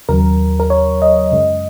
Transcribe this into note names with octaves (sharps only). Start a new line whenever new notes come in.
D#2 C#3 F#3 A#4
A#4
C#5
D#5
F#2 C#3 G#3